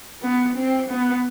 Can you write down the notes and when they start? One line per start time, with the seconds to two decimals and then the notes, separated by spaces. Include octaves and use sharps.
0.22 B3
0.56 C4
0.90 B3